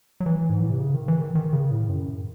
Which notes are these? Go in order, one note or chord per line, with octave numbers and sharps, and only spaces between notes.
F#3
E3
G#2
A2
C3
C#3
D#3
E3
D#3
D#3
C#3
A2
F#2